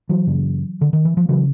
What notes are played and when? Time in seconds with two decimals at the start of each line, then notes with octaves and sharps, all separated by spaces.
0.09 E3 F#3
0.27 F#2 C#3
0.81 D3
0.93 D#3
1.05 E3
1.17 F3
1.29 C#3 E3 F#3